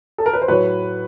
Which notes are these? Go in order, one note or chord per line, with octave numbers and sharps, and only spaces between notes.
A4
A#4
B4
C5
A2 F#3 B4 C#5